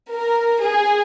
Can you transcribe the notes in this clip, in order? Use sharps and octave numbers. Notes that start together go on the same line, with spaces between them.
A#4
G#4